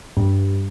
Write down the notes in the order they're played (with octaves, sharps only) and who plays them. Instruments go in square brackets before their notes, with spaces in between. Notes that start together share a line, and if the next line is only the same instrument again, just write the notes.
[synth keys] G2